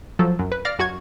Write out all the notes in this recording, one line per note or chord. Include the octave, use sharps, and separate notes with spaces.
F3 F#3 A4
F#2
B4
D5 F5 F6 A#6
F#2 F#4 C#6 G#6